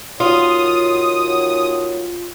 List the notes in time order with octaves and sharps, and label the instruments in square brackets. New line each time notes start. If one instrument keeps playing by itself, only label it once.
[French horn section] D#2 F#4 C#5 [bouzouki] F4 [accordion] D#6